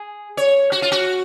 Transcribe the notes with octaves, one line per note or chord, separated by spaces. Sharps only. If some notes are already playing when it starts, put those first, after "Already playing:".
Already playing: G#4
C#5
F#4
F4
F#4